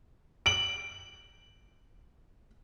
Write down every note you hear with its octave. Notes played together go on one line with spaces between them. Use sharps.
D7 F#7